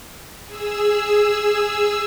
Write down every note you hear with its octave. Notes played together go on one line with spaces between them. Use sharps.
G#4 E6